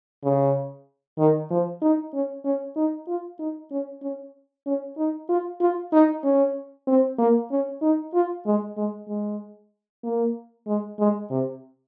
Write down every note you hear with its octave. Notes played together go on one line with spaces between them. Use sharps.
C#3
D#3
F3
D#4
C#4
C#4
D#4
F4
D#4
C#4
C#4
C#4
D#4
F4
F4
D#4
C#4
C4
A#3
C#4
D#4
F4
G#3
G#3
G#3
A#3
G#3
G#3
C3